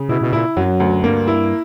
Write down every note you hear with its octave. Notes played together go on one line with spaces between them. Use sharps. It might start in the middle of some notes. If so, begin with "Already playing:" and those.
Already playing: C#3
B2 E4
B2
A#2 E4
F#2 F#3
D2
G2 A#3
E4